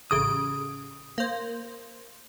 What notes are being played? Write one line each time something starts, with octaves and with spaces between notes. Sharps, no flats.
A1 C#3 D#6 D7
A#3 C5